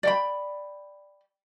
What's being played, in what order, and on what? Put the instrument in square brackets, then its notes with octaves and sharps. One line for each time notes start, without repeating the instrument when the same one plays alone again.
[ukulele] D5 G5 B5